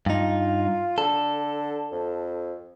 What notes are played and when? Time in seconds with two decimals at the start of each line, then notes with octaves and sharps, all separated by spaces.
0.06 G2 D#4 F4
0.98 D3 A4
1.92 F2